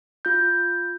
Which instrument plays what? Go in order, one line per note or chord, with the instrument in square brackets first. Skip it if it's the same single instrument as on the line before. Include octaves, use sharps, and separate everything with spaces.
[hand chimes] F4 G6